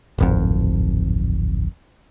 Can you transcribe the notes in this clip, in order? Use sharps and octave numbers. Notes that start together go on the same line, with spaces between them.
D1 G#1 F2